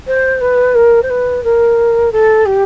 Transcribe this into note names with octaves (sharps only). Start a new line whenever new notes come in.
C5
B4
A#4
C5
B4
A#4
A4
G4